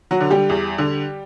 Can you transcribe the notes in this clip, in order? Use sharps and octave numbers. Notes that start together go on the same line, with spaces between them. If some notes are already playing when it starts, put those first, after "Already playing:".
F#3 F#4
D3
G3 G4
E2
D3